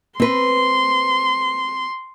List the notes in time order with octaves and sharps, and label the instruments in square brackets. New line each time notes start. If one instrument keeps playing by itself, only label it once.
[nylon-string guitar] C4 B4 [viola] C6